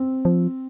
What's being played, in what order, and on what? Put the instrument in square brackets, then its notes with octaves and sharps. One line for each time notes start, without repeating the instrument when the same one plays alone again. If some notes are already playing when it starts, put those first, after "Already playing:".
Already playing: [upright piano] C4
[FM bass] F3